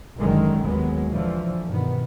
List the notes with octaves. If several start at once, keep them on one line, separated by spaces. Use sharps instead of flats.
F#1 F#2 D3 D#3 G#3
D#2 F#3 G#3 B3
D3 E3 F3
G2 B2 D#3 B3